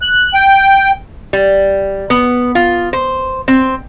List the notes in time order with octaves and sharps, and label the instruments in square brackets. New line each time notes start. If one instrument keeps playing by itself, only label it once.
[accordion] F#6
G5
[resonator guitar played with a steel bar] G3
B3
F4
C5
C4